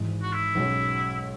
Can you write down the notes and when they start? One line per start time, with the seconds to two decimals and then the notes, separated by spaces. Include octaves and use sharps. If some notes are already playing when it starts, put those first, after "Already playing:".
Already playing: G#1 G#2 E3 G#3
0.22 F#4
0.33 E4
0.55 B1 B2 G#3 C#4